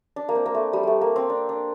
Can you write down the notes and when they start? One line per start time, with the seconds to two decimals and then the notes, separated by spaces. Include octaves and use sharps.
0.16 D4
0.29 A#3
0.35 C4
0.46 A#3
0.54 A3
0.73 G3
0.83 G3 A3
1.01 A#3
1.16 C4
1.30 D4
1.49 D4